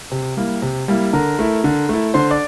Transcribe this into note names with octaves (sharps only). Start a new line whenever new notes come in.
C3
G3 A#3 E4
C3
G3 A#3 E4
D3 A#4 A#5
A3 E4
D3
A3 E4
D3 C5 C6
D5 D6